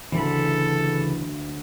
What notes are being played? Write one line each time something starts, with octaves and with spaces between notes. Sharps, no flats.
D2 C#3 E3 A4 B5